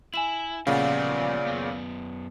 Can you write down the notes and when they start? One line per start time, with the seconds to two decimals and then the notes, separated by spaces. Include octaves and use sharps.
0.14 E4 G#5 E7 F#7
0.67 A#2 C#3 F3 G3 B3 D5 F5 F#5
1.47 F#2 B3